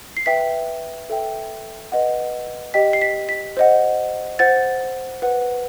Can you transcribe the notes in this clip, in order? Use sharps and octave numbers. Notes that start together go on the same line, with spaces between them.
C7
B4 E5 G5 B6
A4 E5 G5
B4 D#5 F#5
G4 D#5 G5 B6
C7
B6
B6
C5 D#5 F#5
C5 F#5 A6
B4 F#5